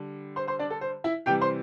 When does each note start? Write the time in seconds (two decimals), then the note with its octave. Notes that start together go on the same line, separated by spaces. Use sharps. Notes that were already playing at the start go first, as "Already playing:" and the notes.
Already playing: D3 G3
0.36 C5 C6
0.48 C5 C6
0.59 D4 D5
0.70 A4
0.81 C5
1.04 E4 E5
1.26 C3 E3 G3 G4 G5
1.41 C5 C6